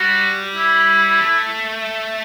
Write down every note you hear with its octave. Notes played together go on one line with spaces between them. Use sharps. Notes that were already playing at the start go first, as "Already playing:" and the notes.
Already playing: G3 F#4
E4
A3